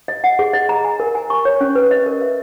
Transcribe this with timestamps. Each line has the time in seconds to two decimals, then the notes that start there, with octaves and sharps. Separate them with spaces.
0.08 D#5
0.24 F#5
0.39 G#4
0.53 D#5
0.69 A#5
0.85 G#5
1.00 A#4
1.15 G#5
1.30 C#6
1.45 C#5
1.61 C#4
1.75 B4
1.91 D#5
2.06 A#4
2.22 E5